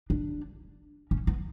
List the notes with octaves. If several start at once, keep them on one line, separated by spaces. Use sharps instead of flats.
D4
C#4
B3